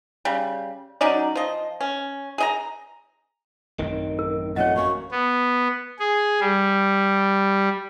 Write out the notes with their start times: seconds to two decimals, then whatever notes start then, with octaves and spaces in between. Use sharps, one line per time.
0.25 C#3 G3
1.01 F#3 C#4 D#4 D5
1.35 F3 D#5
1.81 C#4
2.38 G#4 D#5 A#5
3.79 A1 F#2 D#3 C4
4.19 A#4
4.56 F2 A#2 A3 C#5 D#5 F#5
4.76 F#3 A#3 C#4 C#6
5.11 B3
5.99 G#4
6.41 G3